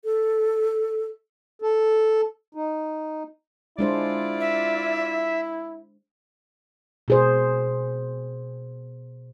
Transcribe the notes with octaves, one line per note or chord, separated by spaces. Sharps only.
A4
A4
D#4
G#3 D4 E4 F4 C5 D5
E5
B2 G#4 C5